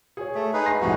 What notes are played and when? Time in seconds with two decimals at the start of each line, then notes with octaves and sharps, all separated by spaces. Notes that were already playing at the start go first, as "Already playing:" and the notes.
0.17 G#4 C#5
0.35 A3
0.53 D#4 G#4 B4
0.66 C6 A#6 C7
0.81 C2 F2 A2 D#4 F#4